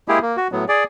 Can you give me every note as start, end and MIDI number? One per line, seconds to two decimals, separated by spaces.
0.08 0.19 56
0.08 0.19 58
0.08 0.19 64
0.08 0.19 67
0.08 0.19 68
0.22 0.37 58
0.37 0.48 66
0.52 0.65 45
0.52 0.65 54
0.52 0.65 59
0.68 0.84 68
0.68 0.84 74